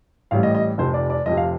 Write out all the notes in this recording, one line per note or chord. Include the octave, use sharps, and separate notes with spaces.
A1 A2 G3 F5
D#5
D#5
F1 F2 C3 C5
D5
D5
F1 F2 C3 D#5
F5